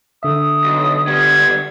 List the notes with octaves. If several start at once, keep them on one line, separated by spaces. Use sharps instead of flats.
D3 E5 D#6
B1
G3 B3 G#6